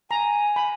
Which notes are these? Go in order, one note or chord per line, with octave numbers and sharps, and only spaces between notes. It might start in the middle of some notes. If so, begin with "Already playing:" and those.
G#5 A#5
B5